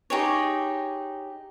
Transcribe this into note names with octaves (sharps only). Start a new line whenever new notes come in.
D#4 G4 G#4 C#5